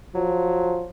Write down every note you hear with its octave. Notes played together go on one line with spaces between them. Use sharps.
F3 F#3